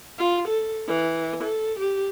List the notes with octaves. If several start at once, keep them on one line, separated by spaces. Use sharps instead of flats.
F4
A4
E3
A4
G4